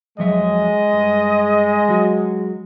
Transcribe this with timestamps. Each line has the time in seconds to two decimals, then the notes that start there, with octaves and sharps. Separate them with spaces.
0.18 F2 F#3 G#3 D#5 E5
0.93 G2
1.89 F#3 F#4